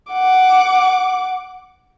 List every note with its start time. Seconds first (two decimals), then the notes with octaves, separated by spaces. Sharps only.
0.13 F#5 D6